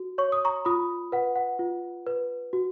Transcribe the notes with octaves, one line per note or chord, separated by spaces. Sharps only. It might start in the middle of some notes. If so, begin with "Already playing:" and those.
Already playing: F#4
C#5 C#6
D#6
A#5 C#6
F4 B5 D#6
B4 F#5
F#5
F4
B4
F#4